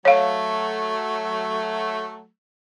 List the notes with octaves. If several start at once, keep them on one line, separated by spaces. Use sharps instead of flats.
F#3 A3 C#5 F5